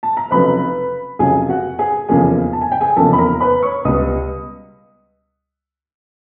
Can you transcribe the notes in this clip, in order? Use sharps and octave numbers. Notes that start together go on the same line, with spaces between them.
A5
A#5
F1 F2 C#3 F#3 B4 B5
F1 F2 C#3 F#3 G#4 G#5
F#4 F#5
G#4 G#5
F1 E2 C#3 F3 A#3 G#4 G#5
A5
G#5
G5
G#4 G#5
F1 E2 C#3 F3 A#3 A4 A5
B5
A#4 A#5
B4 B5
C#5 C#6
C#2 B2 G3 B3 D#5 D#6